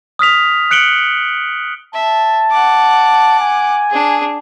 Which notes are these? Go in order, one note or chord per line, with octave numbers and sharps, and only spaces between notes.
D#6 F6 B6 F7
F#6 C#7 D7 F#7 G7
E5 A5
F#5 D6
G#5
D4 G#4